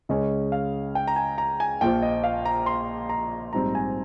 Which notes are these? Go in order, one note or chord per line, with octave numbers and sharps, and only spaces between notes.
C#2 C#3 G#3 C#4 D#5
F5
G5
A#5
G#5
A#5
G#5
A#1 A#2 F3 G5
D#5
F5
A#5
C6
A#5
A#1 G#2 G3 C4 A#5
G#5